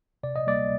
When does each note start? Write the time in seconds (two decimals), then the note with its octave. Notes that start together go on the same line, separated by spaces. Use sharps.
0.23 C3 D5
0.36 D#5
0.47 G3 A#3 D5